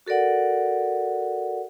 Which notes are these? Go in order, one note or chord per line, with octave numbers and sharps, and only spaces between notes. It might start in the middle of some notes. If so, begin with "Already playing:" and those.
F#4 A4 A#4 D5 F#5